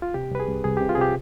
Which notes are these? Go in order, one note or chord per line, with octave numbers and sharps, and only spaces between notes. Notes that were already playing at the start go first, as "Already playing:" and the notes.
F4
C3 G4
C2 B4
G#4
C2
C2 G#4
C3 G4
F4
G#4
C3 G4